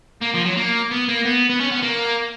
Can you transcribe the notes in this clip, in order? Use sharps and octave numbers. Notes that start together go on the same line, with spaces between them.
A#3
F3
F#3
A#3
B3
A#3
B3
B3
C#4
B3
A#3